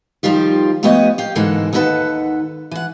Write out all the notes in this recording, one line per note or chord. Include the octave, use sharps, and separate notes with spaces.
D#3 F3 G3 F4 G4
F3 A3 B3 G4 C#5 D#5
G4 F5 G5
G#2 D3 E3 A#3 A4
D#2 D#4 A4 B4 F#5 A5
E3 F#5